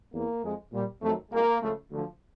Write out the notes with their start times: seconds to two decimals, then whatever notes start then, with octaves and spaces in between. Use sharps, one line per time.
0.13 E2 C3 E3 A#3
0.43 F2 C3 F3 G#3
0.72 A#2 G3
1.02 F2 C3 D#3 F#3 A3
1.31 C2 B2 G#3 A#3
1.61 C#2 C#3 F3 A3
1.90 D2 D3 F3